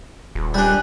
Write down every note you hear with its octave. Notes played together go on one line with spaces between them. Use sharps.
D#1
G3 D4 G#5 F#6